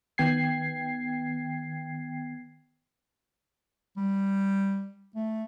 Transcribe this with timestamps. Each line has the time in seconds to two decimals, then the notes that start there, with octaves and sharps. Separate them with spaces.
0.18 D#3 B3 G5 G#6 C7
3.97 G3
5.15 A3